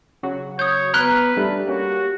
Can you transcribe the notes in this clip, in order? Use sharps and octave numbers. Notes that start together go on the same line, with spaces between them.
C#3 F#3 F#4
C#5 D#6 G6
B3 B4 A#5 F6 F#6
G3 A3 D4 G4
A#3 C#4 F#4